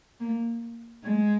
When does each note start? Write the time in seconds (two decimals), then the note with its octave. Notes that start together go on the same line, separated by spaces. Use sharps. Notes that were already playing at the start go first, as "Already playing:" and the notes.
0.20 A#3
1.03 G#3